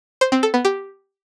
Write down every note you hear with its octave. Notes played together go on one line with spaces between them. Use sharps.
C5
C4
A4
B3
G4